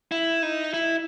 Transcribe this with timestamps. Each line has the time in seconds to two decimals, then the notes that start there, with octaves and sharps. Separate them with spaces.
0.12 E4
0.43 D#4
0.74 E4